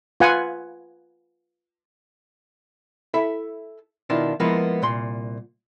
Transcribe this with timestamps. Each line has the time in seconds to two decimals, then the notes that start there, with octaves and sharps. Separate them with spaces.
0.20 F4 B4 F#5 G#5
3.14 E4 A4 E5 B5
4.10 B2 D#3 D4 E4 F4
4.40 F3 G#3 A#3 B3 E4 B4
4.82 C2 A#2 C6